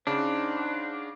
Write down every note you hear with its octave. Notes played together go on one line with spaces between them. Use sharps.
C#3 D4 D#4 C5 F#5